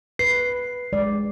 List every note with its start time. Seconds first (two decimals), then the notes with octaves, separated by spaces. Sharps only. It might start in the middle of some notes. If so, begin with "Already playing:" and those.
0.19 B4 C7
0.93 G#3 D5